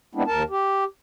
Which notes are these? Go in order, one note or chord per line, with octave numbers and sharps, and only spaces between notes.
G#3 B3 C4 D4 E4
D#2 A#4 A5
G4